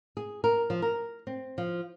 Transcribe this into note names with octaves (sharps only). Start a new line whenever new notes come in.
G#4
A#4
F3
A#4
C4
F3